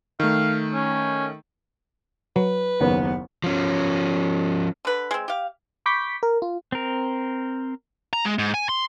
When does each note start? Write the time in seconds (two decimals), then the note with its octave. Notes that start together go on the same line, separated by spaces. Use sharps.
0.20 D#3 A3 F5
0.73 C#4
2.36 F#3 B4
2.81 F#1 D#2 C#3 B3
3.44 F3 C#4
4.85 D3 B4
5.11 G#3 C4
5.28 G4 F5
5.86 B5 C#6 D6 G6 B6
6.23 A#4
6.42 F4
6.72 C4 A#4
8.13 A#5
8.25 G#3
8.39 G#2
8.54 G#5
8.69 C6